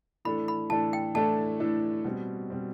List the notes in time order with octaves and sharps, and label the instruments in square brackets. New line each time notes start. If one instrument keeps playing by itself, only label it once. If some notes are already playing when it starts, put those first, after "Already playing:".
[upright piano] A2 E3 A3 D4 A4 [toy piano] B5
[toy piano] B5
[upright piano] A2 E3 A3 D4 A4 [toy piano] A5
[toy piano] G5
[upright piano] A2 E3 A3 D4 A4 [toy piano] A5
[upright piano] A2 E3 A3 D4 A4
B2 G3 C4
B2 G3 C4